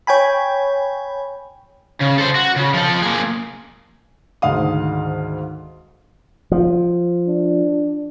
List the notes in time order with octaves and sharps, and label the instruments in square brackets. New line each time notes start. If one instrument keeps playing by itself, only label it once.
[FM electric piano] C#5 G5 G#5 B5
[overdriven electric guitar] C#3
A4 C5
F#4
C#3
F3 A4
A#3 G#4
[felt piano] D2 G#2 D#3 F5 D#6
[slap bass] F3
[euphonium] D4